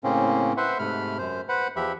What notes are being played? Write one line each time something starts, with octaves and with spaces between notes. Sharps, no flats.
A2 C#3 A#3 C4 C#4
B4 C5 E5 F#5 C6
G#2 C3 A3 B5 F6
F#2 C5
B4 C5 F#5 B5
E2 F3 G4 E5 B5